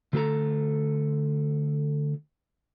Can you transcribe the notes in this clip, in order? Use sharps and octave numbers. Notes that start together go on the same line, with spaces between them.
D3 A3 F4 A4 A#5